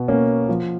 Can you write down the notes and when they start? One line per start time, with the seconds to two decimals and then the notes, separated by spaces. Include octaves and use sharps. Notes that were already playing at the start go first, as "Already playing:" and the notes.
Already playing: B2
0.08 A#3 C#4
0.48 F3